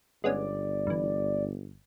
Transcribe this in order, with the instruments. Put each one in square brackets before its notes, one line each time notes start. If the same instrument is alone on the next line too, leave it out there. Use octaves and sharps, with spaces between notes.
[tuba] G1 [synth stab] G#3 B3 C#4 [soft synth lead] D5
[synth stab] G2 E3